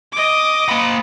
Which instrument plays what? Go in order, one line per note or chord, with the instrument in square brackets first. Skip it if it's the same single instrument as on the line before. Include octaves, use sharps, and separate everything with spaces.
[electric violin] D#5 D6
[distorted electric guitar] A#3 B5